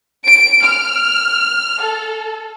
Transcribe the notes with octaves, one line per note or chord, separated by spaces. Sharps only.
D7
F6
A4